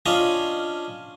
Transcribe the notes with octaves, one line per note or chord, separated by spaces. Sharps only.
C#4 D4 F4 D#5 G#5